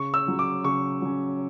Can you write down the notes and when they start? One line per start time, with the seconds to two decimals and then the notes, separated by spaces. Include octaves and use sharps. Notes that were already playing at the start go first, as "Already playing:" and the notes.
Already playing: C#3 C#6
0.14 E6
0.27 F#3 C#4
0.39 D6
0.64 C#3 C#6
1.02 F#3 C#4